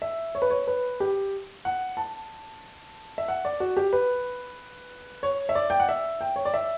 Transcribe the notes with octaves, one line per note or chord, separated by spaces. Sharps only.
E5
C#5
B4
C#5
B4
G4
F#5
A5
E5
F#5
D5
F#4
G4
B4
C#5
E5
D5
G5
F#5
E5
G5
C#5
D5
E5